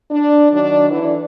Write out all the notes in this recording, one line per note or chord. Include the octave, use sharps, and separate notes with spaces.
D4
D#3 F#3 D4
D3 E3